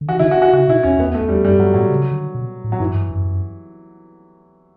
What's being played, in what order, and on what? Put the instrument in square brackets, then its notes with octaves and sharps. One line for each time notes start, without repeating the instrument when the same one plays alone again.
[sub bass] D3
[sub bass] E3 [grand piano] F#4
[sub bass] C#3 [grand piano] E4
[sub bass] D3
[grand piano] F#4
F#4
[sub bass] C#3 [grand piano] F#4
[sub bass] B2 [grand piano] E4
[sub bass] E2 [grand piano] C#4
[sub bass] E2 [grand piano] B3
[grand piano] A3
[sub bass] E2
[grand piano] G3
[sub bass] F#2 [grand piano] G3
[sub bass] G2 [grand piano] F#3
[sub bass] A2 [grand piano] F#3
[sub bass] C#3
D3
B2
A2
[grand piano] F#3
[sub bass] G2 [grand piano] E3
[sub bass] G2
F#2
F#2